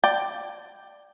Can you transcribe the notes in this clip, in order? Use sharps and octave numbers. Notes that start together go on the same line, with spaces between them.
D5 G5